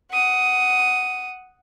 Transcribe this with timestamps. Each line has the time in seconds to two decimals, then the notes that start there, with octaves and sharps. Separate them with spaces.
0.11 F#5 D#6